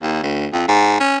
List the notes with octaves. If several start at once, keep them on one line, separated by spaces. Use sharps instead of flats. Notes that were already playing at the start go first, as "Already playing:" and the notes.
D#2
D2
F2
G#2
C#4